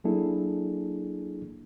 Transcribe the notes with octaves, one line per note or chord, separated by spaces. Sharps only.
F#3 A#3 D4 E4 G#4 A4